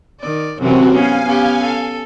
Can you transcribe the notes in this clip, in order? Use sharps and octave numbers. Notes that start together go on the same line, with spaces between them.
D#3 D5
F#2 C3 E3 C4 F#4
B3 C#4 F5 G#5
B3 C#4 G4
A4